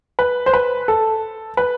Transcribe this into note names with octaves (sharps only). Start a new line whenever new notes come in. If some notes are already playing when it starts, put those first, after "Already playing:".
B4
C5
B4
A4
B4